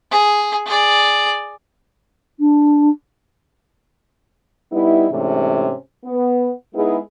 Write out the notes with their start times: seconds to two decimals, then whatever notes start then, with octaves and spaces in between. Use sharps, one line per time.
0.11 G#4
0.66 G#4 D5
2.40 D4
4.72 G3 B3 D#4 E4
5.11 G#2 C3 E3 A3 C#4 D4
6.05 B3
6.75 G#3 B3 D#4 E4 G#4